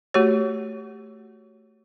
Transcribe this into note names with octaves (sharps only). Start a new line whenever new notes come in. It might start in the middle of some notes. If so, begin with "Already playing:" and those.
A3 F#4 G4 C#5